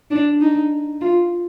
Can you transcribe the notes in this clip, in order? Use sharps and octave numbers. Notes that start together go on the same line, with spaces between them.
D4
D#4
F4